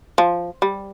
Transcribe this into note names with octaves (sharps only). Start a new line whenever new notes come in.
F3
G3